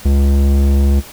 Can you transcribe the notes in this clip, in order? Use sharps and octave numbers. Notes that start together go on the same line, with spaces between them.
C#2